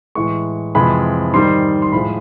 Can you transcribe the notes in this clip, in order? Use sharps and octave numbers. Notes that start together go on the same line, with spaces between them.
A2 E3 G#3 C#6
F2 C3 E3 G#3 B5
G#2 D#3 G3 C6
C6
A2 F3 G#3 B5